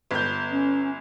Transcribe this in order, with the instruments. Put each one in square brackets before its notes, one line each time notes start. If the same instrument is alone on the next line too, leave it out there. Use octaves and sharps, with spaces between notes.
[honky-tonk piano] G1 G6
[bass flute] C#4